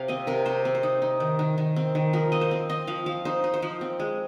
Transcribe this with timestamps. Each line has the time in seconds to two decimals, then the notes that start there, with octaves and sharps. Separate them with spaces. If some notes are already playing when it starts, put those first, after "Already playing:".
Already playing: C3 F5
0.08 C4 D#5
0.27 C3 A#4
0.46 C3 C5
0.65 C4
0.75 C5
0.83 D#4
1.02 D#4
1.20 D#3
1.39 D#3
1.58 D#3
1.76 C4
1.95 D#3
2.13 F3 A#4
2.32 C4 D#5
2.41 C5
2.51 C4
2.69 C4 D#5
2.87 F3 F5
3.06 F3 F5
3.25 D#4 C5
3.44 D#4
3.54 C5
3.62 F3
3.81 C4
4.00 G#3